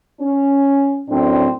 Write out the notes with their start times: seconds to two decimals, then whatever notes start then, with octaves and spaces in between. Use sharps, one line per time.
0.21 C#4
1.08 F#2 A2 C4 D4